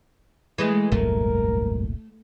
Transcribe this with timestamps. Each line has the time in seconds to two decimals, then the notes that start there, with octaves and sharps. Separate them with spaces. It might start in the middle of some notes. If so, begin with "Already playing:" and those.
0.58 E3 G#3 A3
0.92 F1 C2 G2 A#2 F#3 G#3 A3 A#4